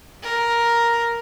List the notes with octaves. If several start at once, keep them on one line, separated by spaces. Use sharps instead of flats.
A#4